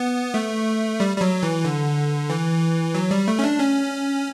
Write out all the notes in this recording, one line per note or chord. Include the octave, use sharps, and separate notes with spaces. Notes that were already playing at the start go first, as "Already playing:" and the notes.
Already playing: B3
A3
G3
G3
F#3
E3
D3
E3
F#3
G3
A3
C#4
D4
C#4